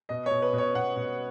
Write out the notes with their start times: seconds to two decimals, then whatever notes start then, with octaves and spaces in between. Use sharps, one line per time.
0.09 B2 D#5
0.26 B2 C#5
0.42 B4
0.53 B2
0.58 C#5
0.75 B2 F#5
0.96 B2